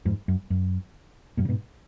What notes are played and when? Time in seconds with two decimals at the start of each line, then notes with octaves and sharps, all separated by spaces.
0.05 F2 G#2
0.28 F#2
0.50 F#2
1.37 F#2 A#2
1.45 C#3
1.49 G#2 B2